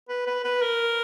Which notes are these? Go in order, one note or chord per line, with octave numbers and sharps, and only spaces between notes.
B4
B4
B4
A#4